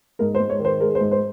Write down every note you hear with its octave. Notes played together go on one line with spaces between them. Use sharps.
G#2 A#4
C5
G#2
C#5
D#3
C5
G#3 A#4
C5
G#2
C5